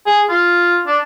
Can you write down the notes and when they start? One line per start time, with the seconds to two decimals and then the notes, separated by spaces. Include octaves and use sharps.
0.06 G#4
0.29 F4
0.87 D4